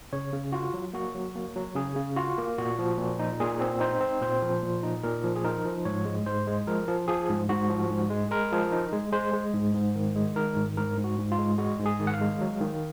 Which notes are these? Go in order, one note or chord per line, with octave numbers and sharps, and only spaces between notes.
C#3 C#5
C#3
F4 F#4
F#3
A#3 F#4
F#3
A#3
F#3
C#3 G#4
C#3
F4 F#4
A#3
A#2 F#4
F3
A#2
D#4
A#2 G#4
C4
D#4 C5
C4
A#2 C5
F3
A#2
D#4
A#2 A#4
F3
G#4
D#4 A#4
F3
G#2 C#5
G#3
G#2 C5
G#3
F3 A#4
F3
F3 G#4
G#2
G#2 F#4
F3
G#2
G#3
G#3 A#4
F3
D#4
G#3
G#3 C5
G#3
G#2
G#2
D#3
G#3
D#3 A#4
G#2
G#2 A#4
G#2
F#4
G#2
F4
G#3
G#3 F#4
G#2
G#4
D#3
F#5
F5
G#3
F#3
D#3